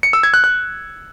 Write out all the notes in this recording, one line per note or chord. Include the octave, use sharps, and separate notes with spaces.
C#7
E6
G#6
F#6
F#6